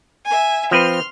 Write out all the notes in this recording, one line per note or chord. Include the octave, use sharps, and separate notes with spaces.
E5 G#5
F3 C4 B4 C6 F6